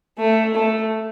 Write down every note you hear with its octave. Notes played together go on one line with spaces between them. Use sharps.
A3
A3